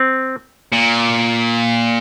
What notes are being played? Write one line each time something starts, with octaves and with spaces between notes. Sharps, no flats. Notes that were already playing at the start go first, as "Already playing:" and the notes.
Already playing: C4
A#2